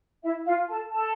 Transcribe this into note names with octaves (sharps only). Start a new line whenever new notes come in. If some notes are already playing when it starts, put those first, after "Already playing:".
E4 E5
F4 F5
A4 A5
A4 A5